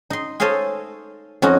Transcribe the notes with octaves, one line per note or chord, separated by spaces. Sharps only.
D#4 C6
A4 C5 C#5 D#5 F5 G#5
F2 C#4 D#4 F#4